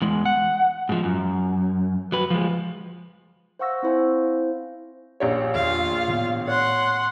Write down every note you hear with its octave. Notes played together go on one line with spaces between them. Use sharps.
E2 G#3
F#5
G#2 F3
F#2
F#3 B4
F3 G#3
C5 F5 F#5 C#6 E6 A#6
C4 E4 C5 F5 G#5
A#1 G4 C#5
E2 D#3 F4 F5
A2 D#3 B3
C#5 F#5 C6